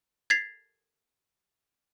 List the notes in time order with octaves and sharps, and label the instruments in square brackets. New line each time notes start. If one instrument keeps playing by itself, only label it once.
[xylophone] G#6 A6 B6 C7 F7